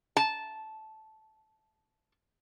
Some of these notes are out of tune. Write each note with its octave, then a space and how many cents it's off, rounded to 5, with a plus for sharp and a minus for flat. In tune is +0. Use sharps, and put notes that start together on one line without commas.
A5 -10